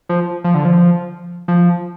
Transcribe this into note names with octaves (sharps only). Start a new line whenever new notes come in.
F3
F3
D3
F3
F3